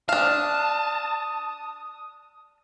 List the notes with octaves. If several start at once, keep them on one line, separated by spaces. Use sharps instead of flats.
D4 F5 A5 D#6 F6